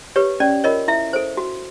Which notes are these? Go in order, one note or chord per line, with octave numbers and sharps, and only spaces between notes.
G4 B4 C#5
C#4 D5
F4 A#4 C#5 D#5
E4 E5
A4 C5
F#4